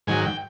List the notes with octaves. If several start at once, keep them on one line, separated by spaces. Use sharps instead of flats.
G#2 D#3 F#3 G#5
G5